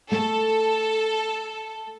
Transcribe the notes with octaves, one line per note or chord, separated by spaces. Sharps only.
A3 A4